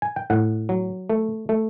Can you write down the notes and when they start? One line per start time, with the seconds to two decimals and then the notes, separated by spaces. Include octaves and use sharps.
0.02 G#5
0.16 G5
0.30 A2 F#5
0.69 F#3
1.10 A3
1.49 A3